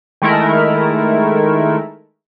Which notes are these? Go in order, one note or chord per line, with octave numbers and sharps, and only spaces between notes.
D#3 G#3 A3 E4 A#4